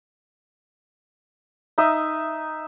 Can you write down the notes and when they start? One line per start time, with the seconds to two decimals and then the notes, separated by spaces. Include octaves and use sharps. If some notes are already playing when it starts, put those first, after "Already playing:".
1.78 D#4 E5 D#6